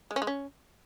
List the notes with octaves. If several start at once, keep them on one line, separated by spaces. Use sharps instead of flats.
G#3
C#4
G#3
C#4